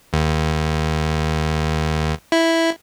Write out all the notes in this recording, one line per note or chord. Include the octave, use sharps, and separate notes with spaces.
D#2
E4